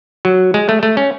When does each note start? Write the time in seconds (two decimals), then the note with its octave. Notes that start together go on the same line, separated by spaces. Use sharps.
0.25 F#3
0.54 G#3
0.69 A3
0.83 A3
0.97 C#4